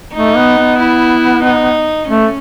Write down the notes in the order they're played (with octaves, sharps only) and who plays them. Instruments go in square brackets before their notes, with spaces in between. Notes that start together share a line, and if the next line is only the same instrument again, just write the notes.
[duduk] A3 [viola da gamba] D#4
[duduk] B3
B3
[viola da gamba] E4
D#4
[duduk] A3 [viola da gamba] C#4